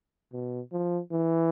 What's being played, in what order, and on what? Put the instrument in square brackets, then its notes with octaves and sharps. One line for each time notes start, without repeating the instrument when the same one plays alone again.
[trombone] B2
F3
E3